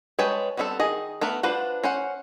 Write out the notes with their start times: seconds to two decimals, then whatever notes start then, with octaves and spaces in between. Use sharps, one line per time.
0.19 G#3 B4 C#5 G5 A5
0.57 G3 B3 C4 E4 A4
0.80 D#3 G#4 D#5
1.21 A3 B3 A#4 F#5
1.43 D4 F4 B4 C5 F#5
1.84 C#4 C5 F#5